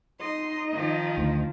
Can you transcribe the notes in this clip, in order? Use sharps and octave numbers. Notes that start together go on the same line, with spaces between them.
D#4 D#5 C6
D#3 F3
D2